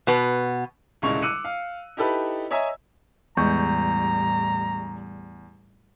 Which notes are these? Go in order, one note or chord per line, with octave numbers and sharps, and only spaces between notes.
B2 B3
D#1 C2 C#3 G#3 C#6 F7
D6 E6 F#6 C#7 D#7
F5
D#4 E4 G4 A4 B4 B5
C#5 D#5 E5 G#5 A#5 E6
E2 A2 G3 G#3 A#5 C#6 G6